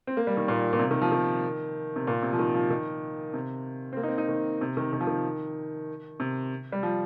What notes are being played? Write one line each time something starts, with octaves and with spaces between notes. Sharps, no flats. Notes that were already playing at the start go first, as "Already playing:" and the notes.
C4
A#3
G3
D#3
A#2
A#2
C3
D#3
F3
D#3
C3
A#2
C3
F3
D#3
F3
D#3
C3
C4
A#3
D#4
C4
D#4
D#3
C3
D#3
D#3
F3
D#3
C3
G3
F3